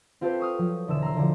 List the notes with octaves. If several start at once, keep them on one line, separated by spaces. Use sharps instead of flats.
C4 F4 G4 A4 B4 C5
C#6 D#6 F6
F3 F#3
E1 D3 E6 E7
A#5 C6 E6
D3 F3